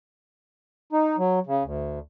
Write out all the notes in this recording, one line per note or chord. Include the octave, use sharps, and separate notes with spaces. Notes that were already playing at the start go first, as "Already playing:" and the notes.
D#4
F#3
C#3
D2